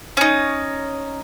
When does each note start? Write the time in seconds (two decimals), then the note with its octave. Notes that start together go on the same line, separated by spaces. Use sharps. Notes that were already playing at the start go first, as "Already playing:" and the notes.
0.17 C#4 D#4